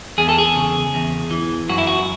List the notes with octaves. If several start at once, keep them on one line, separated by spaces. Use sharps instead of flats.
E2 G#4
A4
G#4
C#3
E2
E3
F#2 F#4
E4
F#4